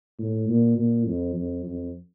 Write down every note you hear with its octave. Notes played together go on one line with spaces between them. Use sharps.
A2
A#2
A#2
F2
F2
F2